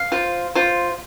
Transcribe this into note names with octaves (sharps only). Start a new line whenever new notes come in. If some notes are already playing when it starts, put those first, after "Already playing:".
Already playing: F5
F4 C5
F4 C5